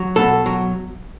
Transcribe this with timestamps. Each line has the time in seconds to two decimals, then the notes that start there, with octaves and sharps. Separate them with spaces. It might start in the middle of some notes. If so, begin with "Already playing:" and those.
Already playing: F#3
0.16 B2 A4
0.46 F#3